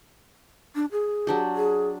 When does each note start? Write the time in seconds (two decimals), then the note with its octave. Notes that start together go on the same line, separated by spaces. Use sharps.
0.75 D4
0.92 G#4
1.27 F#3 D4 G4
1.56 G#4